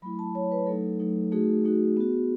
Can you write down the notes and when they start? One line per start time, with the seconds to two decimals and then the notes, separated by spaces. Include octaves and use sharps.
0.02 F#3 A3 E4 B5
0.19 A5
0.35 F#3 A3 E4 C#5
0.52 B4
0.67 F#3 A3 D#4 A4
1.00 F#3 A3 D#4
1.32 A3 D#4 F#4 G#4
1.65 A3 D#4 F#4
1.97 B3 F#4